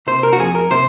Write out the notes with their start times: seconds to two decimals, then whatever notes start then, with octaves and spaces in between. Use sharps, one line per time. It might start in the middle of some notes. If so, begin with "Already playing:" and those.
0.07 C3 C5
0.23 A#4
0.33 F#4
0.39 F2 G#4
0.55 A#4
0.71 C3 C5